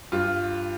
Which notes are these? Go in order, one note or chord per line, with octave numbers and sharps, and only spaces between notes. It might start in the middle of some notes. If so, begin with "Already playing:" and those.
G2 F4